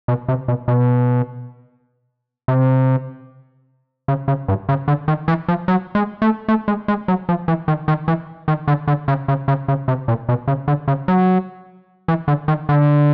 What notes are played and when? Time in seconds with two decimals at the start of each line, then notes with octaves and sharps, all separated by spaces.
0.08 B2
0.28 C3
0.48 B2
0.68 B2
2.48 C3
4.08 C#3
4.28 C#3
4.48 G2
4.69 C#3
4.88 D3
5.08 D#3
5.28 E3
5.48 F3
5.68 F#3
5.95 G#3
6.22 A3
6.48 A3
6.68 G#3
6.88 G#3
7.08 F#3
7.29 F3
7.48 E3
7.68 D#3
7.88 D#3
8.08 E3
8.48 D#3
8.68 D3
8.88 D3
9.08 C#3
9.28 C#3
9.48 C#3
9.68 C#3
9.88 C3
10.08 A#2
10.29 B2
10.48 C#3
10.68 D3
10.88 C#3
11.08 F#3
12.08 E3
12.28 D3
12.48 D#3
12.69 D3